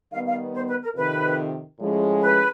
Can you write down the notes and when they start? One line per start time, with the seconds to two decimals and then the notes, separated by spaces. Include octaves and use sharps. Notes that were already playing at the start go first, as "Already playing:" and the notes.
0.12 D#3 G3 B3 F5
0.26 F5
0.54 C5
0.68 B4
0.82 A#4
0.95 F2 C3 D#3 B4
1.79 A2 F3 G#3 C#4
2.21 B4